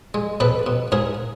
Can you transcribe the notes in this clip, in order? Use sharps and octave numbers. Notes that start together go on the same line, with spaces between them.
G#3
B2 A4 B4
B2
G#2 G#4 A#4